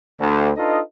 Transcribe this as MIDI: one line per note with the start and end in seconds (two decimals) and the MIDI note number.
0.19 0.50 38
0.57 0.80 62
0.57 0.80 63
0.57 0.80 65
0.57 0.80 69
0.57 0.80 71
0.57 0.80 75